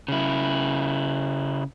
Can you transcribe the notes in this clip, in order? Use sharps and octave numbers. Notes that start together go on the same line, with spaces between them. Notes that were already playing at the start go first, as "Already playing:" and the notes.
C#3 E4